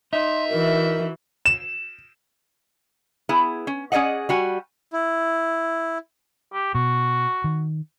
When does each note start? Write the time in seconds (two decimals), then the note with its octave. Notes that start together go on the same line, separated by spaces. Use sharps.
0.13 D#4 E5 C6
0.49 E3 F#4 A#4
1.46 E7
3.29 B3 E4 G#4
3.67 C#4
3.92 C#4 G#4 D5 D#5 F#5
4.29 G3 F#4 G#5
4.93 E4
6.54 G4
6.75 B2 F#4
7.44 D#3